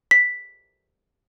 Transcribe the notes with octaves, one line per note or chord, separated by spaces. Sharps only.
B6